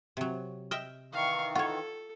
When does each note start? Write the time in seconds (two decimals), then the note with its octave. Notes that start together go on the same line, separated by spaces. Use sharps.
0.17 C3 F#3
0.71 D#5 E5 G5 F6
1.13 D#3 E3 F5 C#6
1.55 F4 A4 C#5 F#5 C#6